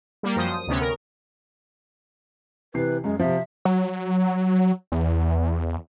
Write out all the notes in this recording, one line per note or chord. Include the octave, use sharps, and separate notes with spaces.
G3 A#3
F#2 F3 C5 D#6
D#6
D2 C3 B3 C#4
A#4
C3 E3 B4 C7
F#2 G#3
C3 F3 E5
F#3
E2